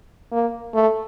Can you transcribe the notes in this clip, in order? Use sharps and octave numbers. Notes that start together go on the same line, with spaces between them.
A#3
A3